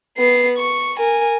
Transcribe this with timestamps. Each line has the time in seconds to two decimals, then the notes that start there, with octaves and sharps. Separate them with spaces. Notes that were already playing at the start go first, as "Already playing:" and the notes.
0.18 B3 C7
0.58 C#6
0.98 A#4 G#5